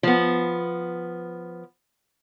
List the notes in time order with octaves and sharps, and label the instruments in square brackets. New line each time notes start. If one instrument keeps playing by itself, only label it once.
[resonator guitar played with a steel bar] F3 B3